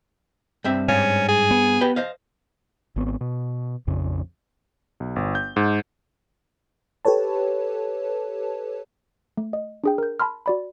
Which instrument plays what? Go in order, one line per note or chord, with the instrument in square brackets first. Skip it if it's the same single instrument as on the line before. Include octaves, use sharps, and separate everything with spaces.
[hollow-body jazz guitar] G2 C4 E5
[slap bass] G#2 [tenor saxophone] C#4
[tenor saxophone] G#4
[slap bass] B3
[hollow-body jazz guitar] G4 B4 G5
C5 D#5 F5
[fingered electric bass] G#1 B3 C4
B2
A#1 F2 C#3
[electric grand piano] B1
G1
G6
G#2
[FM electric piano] G4 A4 B4 C#5 A5
[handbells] A3
D#5
D4 G#4 G5
A#4 G6
A5 B5 C6 F6
F#4 D5 B5